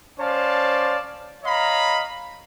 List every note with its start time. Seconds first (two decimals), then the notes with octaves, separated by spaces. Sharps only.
0.19 C#4 C5 D5 F5 A5
1.43 C#5 D#5 F5 A#5 B5